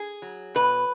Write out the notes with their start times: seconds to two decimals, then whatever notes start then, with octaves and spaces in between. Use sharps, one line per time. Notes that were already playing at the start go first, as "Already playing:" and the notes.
Already playing: G#4
0.22 F#3
0.55 B2 B4